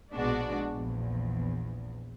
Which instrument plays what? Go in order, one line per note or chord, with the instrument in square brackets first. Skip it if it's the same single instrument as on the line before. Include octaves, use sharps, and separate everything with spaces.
[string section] A#1 B2 G#3 D4 F#4 D5
A#1 E2